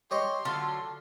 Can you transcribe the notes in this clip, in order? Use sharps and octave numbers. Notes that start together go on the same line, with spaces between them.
G4 C#5 D#5 C6
D3 F#3 A3 F4